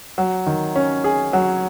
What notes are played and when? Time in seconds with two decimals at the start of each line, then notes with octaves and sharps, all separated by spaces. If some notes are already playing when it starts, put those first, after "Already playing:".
0.18 F#3
0.47 D#3
0.76 C#4
1.04 G#4
1.33 F#3